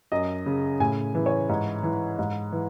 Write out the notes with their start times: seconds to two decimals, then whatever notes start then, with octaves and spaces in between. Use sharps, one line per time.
0.12 F#2 D#5
0.46 C#3
0.80 A2 G#5
1.15 E3
1.26 C#5
1.49 G#2
1.83 E3
2.19 G#2
2.52 E3